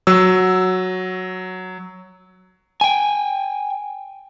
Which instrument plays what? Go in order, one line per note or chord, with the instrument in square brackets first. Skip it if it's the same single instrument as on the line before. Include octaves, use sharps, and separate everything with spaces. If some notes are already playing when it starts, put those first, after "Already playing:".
[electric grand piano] F#3 E6
[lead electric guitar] G5 G#5